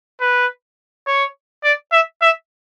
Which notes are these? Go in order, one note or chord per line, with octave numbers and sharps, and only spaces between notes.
B4
C#5
D5
E5
E5